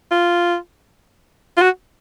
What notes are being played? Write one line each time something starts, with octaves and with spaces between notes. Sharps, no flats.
F4
F4
F#4